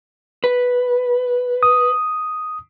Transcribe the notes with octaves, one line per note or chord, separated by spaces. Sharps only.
B4
D#6